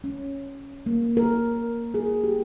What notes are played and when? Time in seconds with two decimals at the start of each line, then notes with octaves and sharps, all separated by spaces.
0.04 C#4
0.86 A#3
1.17 A#4
1.94 G#4
2.24 G4